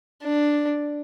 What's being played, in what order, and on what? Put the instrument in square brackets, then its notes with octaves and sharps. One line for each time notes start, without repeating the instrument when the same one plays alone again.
[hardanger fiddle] D4